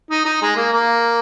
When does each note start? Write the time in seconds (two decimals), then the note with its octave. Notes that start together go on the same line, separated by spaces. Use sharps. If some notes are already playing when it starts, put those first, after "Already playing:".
0.10 D#4
0.25 D#4
0.42 G#3
0.56 A#3
0.73 A#3